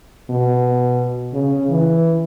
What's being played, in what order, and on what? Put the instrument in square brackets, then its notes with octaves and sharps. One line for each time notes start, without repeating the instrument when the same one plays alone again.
[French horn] B2
C#3
E3